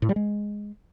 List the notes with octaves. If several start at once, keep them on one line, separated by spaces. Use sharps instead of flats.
A2
G3
G#3